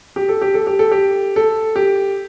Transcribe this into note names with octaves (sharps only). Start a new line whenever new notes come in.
G4
A4
G4
A4
G4
A4
G4
A4
G4